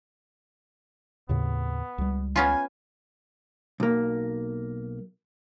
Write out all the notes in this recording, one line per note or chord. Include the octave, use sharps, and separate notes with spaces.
D#2 A2 C#3 B3
C#2 G3
B3 C#4 F4 G#5
B1 A#3